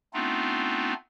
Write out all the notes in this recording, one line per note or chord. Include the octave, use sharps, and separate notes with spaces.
A3 B3 C4 D4 D#4 F4